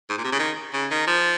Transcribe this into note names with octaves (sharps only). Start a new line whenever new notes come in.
G#2
A#2
C3
C#3
D#3
C#3
D#3
F3